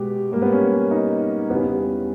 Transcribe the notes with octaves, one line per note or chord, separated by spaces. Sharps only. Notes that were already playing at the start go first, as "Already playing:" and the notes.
Already playing: B2 G#3 G4
G#2 G3 A#3
B3
C#4
D#4
E2 C#3 G3 B3